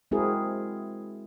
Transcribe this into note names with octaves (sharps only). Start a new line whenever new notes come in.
G#3 C4 E4 F#4 G#4 A#4